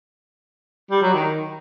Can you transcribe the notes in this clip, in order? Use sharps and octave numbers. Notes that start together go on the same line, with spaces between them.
G3
F#3
D#3